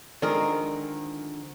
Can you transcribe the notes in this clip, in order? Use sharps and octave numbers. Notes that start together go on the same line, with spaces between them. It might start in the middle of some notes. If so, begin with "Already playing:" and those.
D3 D#3 F3 G#3 C4 A#4